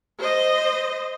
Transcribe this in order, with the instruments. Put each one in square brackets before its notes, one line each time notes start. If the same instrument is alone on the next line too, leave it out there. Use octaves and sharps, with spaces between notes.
[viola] C5 D#5